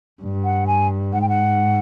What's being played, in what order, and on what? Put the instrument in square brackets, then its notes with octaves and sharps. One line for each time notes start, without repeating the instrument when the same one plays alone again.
[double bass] G2
[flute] F#5
G#5
[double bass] G#2 [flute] F#5
[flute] G5
F#5